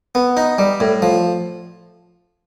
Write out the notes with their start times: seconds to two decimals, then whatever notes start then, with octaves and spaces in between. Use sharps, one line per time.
0.15 B3
0.37 D#4
0.58 G3
0.80 A2
1.02 F3